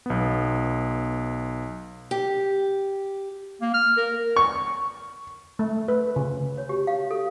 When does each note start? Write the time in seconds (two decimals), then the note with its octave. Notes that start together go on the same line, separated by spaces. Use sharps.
0.06 B1 B3
2.11 G4
3.62 A#3
3.74 F6
3.97 A#4
4.36 C#6
5.59 A3
5.88 B4
6.16 C#3
6.57 C#5
6.69 G4
6.87 F5
7.11 A4